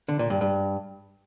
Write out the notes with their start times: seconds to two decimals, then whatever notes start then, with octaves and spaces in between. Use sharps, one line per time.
0.08 D3
0.19 A#2
0.30 G2
0.41 G2